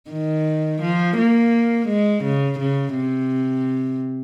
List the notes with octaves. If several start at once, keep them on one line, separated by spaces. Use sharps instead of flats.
D#3
F3
A#3
G#3
C#3
C#3
C3